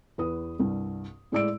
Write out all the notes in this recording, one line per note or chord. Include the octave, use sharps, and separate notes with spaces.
E2 B4 D#6
C2 G2
A2 G#3 E4 D5 E6 D7